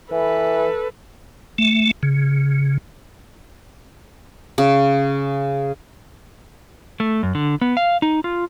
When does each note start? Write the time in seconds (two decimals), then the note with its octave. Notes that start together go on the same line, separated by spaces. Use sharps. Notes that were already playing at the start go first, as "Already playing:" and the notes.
0.12 E3 A4 B4
1.58 A3
2.03 C#3
4.58 C#3
7.00 A3
7.23 F#2
7.35 D3
7.61 B3
7.77 F5
8.02 D#4
8.24 F4